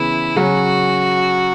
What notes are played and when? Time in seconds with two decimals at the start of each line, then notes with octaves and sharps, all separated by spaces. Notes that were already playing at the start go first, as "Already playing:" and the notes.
Already playing: C#3 E3 B3 E4
0.36 C#3 F#3 C#4 F#4